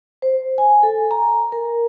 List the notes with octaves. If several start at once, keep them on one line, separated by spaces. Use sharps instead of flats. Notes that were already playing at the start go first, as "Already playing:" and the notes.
C5
G#5
A4
A#5
A#4